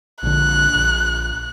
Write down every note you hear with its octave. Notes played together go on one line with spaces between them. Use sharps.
A#1 D3 F#6
A#1